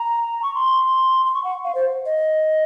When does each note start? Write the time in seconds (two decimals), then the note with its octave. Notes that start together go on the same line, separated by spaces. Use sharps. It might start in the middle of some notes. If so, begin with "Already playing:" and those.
Already playing: A#5
0.43 C#6
0.55 C6
1.26 C6
1.34 C#6
1.44 F#5
1.64 F5
1.75 C5
2.06 D#5